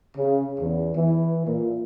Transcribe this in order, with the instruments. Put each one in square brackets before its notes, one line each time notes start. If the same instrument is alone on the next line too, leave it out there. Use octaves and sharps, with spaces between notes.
[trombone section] C#3
E2
E3
A#2